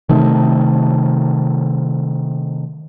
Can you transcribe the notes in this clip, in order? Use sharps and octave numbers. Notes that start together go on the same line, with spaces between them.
C3 D#3 A3